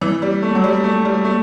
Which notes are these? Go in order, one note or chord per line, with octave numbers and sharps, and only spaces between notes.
E3
G3
A3
F#3
G3
A3
G3
A3